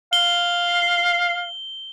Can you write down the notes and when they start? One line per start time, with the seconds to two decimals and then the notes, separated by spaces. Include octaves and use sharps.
0.13 F5 G7